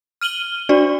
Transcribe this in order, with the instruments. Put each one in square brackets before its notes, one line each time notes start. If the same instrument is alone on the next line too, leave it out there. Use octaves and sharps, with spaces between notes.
[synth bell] F6 D#7 F#7 G7
D4 F#4 D5